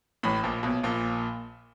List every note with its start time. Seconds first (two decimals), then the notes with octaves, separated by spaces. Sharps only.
0.23 A1 A2
0.43 A#1 A#2
0.63 B1 B2
0.83 A#1 A#2